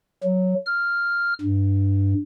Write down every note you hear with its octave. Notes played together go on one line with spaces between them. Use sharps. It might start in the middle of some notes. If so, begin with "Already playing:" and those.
F#3
F6
G2